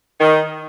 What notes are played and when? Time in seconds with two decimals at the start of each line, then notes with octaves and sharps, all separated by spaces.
0.20 D#3